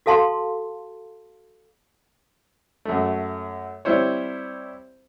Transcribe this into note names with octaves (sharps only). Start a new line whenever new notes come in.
F#4 A4 F5 A5 C6
F#2 A3
G3 C4 E4 C5 C#5